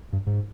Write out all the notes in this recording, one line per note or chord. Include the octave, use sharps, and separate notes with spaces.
G2
G#2